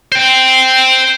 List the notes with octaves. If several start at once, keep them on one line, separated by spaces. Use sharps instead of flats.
C5 G5